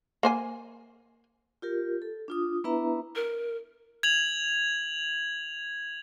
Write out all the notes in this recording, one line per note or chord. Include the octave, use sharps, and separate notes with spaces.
A#3 C5 G#5
F4 G4 A#4
A4
D4 F4 D#6
B3 D4 E4 B4 E5 A#5
A#4
G#6 F7 F#7